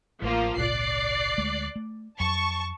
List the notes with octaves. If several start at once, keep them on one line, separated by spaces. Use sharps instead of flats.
A1 F3 A3 A#3 F4
G#1 C#2 A#2 D5 F#6 C7
D2 G#3 A3
A3
F2 F#3 A5 C#6